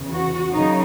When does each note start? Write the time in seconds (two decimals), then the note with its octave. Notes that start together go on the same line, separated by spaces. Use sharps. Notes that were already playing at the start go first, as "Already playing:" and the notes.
Already playing: E2 C#3 E3
0.10 F#4
0.53 F#2 C#3 D#4